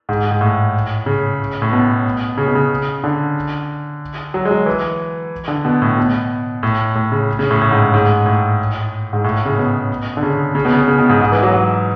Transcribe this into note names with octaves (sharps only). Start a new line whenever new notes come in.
G#2
G#2
A2
C#3
A2
B2
C#3
B2
C#3
D3
F#3
G#3
F#3
E3
D3
B2
A2
B2
A2
A2
C#3
C#3
A2
A2
G#2
G#2
A2
G#2
A2
C#3
B2
D3
C#3
C#3
B2
C#3
B2
C#3
B2
G#2
G#2
E3
F#3
F#3